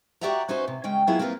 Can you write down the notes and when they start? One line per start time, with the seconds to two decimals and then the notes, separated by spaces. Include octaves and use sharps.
0.21 F#4 G4 D5 E5 F#5 A#5
0.49 C#4 D#4 F#4 B4 C5
0.68 C3
0.84 C#3 G#3 C#4 G5
1.07 F#3 A#3 B3 E4 F4 G#4
1.19 A#3 C4 E4 F4 G4 B4